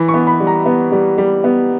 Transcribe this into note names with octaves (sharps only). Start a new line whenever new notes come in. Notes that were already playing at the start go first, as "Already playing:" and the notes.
Already playing: E3 B5
C#6
B3
B5
G3
A#5
B3
G3
G3
B3